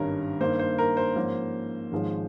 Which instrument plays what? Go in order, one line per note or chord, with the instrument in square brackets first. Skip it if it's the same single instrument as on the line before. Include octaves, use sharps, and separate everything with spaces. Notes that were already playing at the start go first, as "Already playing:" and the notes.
Already playing: [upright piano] G#1 G2 G3 C#4 A#4
G2 D#3 A#3 C5
C5
A#4
C5
G#2 F3 A#3 C#4
G#1 G#2 F3 G#3 C#4